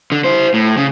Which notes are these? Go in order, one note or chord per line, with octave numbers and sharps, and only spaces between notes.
D3
E4 C5
A2
C#3